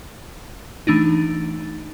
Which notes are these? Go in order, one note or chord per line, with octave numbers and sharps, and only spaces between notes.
E3 A3 D4 D#4